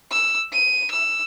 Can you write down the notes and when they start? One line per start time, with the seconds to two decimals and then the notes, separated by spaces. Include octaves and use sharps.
0.11 E6
0.53 D#7
0.91 E6